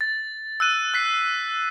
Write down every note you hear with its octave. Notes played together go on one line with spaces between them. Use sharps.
A6
E6 F#6 D#7
F#6 B6 C7